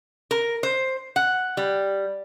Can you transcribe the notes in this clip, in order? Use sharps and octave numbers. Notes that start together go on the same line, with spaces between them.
A#4
C5
F#5
G3